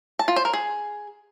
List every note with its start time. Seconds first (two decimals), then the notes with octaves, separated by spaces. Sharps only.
0.19 A5
0.28 F4
0.36 C5
0.45 A#4
0.53 G#4